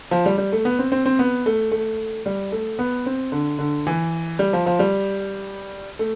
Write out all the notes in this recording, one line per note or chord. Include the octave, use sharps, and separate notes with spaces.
F3
G3
G3
A3
B3
C4
C4
C4
B3
A3
A3
G3
A3
B3
C4
D3
D3
E3
G3
F3
F3
G3
A3